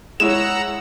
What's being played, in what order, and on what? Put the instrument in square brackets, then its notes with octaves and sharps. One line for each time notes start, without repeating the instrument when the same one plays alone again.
[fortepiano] G#3 E4 C#5 [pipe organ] F#5 A#5 E6 [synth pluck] E7